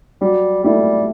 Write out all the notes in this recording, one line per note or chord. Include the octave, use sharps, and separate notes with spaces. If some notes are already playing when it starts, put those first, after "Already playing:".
F#3 G3
G3 A3 E4